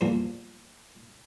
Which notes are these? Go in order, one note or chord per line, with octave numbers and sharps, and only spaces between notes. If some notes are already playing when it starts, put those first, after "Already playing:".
E2 G2 A#2 F3 G3 A#3